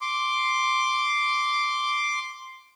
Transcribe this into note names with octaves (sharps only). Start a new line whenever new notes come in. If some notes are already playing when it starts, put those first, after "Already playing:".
C6 D6